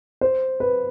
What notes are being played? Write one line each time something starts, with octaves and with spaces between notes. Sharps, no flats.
C5
B4